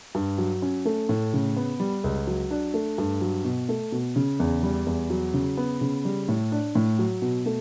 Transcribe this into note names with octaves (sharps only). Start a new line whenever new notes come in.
G2
F#3
C#4
A3
A2
C#3
B3
G3
C#2
F#3
D4
A3
G2
F#3
B2
A3
B2
C#3
E2
G3
E2
F#3
C#3
B3
C#3
G3
A2
D4
A2
F#3
B2
A3